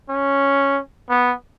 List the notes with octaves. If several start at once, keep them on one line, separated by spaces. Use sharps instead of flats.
C#4
B3